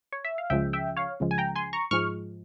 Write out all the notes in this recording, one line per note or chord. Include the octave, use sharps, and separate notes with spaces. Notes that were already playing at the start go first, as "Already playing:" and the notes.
C#5
E5
F5
C#2 C#3 F3 G#3 E5 G5
E5 G5
C#5 F5
C#2 C#3 F3 G#3
G#5
G5 A#5
G#5 C6
A#5 C#6
G#2 F3 G#3 C#6 F6